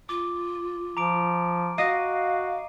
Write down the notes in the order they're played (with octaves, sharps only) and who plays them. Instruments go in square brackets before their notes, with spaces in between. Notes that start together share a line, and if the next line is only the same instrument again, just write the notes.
[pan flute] F4 [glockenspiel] D6
[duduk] F3 [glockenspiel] A#5 D6 D7
[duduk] F#4 [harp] D#5 [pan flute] F5 [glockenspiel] C7 D#7